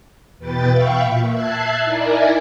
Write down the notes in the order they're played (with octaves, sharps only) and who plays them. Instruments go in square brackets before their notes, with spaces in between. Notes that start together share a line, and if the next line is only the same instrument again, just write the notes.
[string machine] E2 B2 B4 G5 A6
E5 F5 G5 B5 C#6
A#2
E5 A5 F#6 G#6 C7
D#4 E4 A#4 D5 G#5